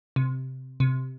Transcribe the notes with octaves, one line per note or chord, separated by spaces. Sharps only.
C3
C3